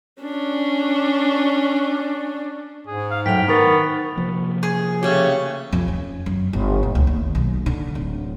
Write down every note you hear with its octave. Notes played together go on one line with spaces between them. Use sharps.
C#4 D4
G#2 G#4
F5
F#2 A2 G5 B6 F7
D#3 B3 A#4 B5 C#6 A6
C3 F3 A#3
G#4
C#3 A3 G4 C#5
F2
C#4
F#2
G1
A#2
D2
D#2
B1
D3
D1